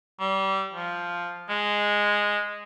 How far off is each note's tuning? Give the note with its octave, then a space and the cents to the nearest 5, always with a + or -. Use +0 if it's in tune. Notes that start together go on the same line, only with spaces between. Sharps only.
G3 -25
F3 +0
G#3 -5